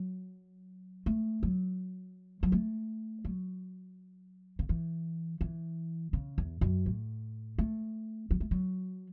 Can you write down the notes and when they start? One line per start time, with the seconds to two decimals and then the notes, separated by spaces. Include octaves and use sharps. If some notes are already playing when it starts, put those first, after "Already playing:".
Already playing: F#3
1.06 A3
1.43 F#3
2.43 F#3
2.52 A3
3.25 F#3
4.59 C#3
4.69 E3
5.41 E3
6.13 C#3
6.38 E2
6.61 F#2
6.86 A2
7.58 A3
8.31 F#3
8.40 A3
8.51 F#3